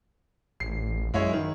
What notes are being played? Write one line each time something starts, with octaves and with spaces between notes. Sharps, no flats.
A1 C7
F#2 G#3 E4 C#5
D#3